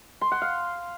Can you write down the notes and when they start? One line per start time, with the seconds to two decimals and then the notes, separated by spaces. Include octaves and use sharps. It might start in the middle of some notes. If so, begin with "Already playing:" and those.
0.21 C6
0.31 F#5
0.42 F5